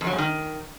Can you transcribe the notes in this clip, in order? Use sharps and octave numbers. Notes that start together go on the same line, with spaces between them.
F2
F#3
G#2
D#3